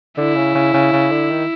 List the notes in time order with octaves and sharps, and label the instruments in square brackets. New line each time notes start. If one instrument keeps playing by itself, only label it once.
[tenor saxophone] D3 [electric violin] E4
[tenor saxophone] C#3
C#3
C#3
C#3
D3
D#3